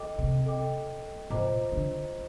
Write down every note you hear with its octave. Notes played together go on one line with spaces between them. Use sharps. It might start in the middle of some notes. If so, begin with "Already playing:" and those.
Already playing: A4 D#5 G5 D6
C3
A4 D#5 G5 D6
A#2 F4 C5 D#5 A#5 D6
D3